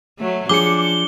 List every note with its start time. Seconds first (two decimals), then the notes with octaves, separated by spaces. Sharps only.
0.19 F#3 A3
0.49 F3 D4 G#4 D6 C#7 G7